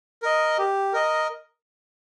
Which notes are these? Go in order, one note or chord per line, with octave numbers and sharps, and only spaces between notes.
A#4 D#5
G4
A#4 D#5